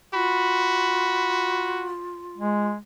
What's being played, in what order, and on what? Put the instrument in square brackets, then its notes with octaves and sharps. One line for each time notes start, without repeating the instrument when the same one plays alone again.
[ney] F4 [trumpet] F#4 [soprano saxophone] B5
[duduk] G#3